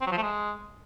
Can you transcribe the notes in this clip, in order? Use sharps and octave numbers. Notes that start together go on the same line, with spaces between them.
C4
F#3
F3
A3
G#3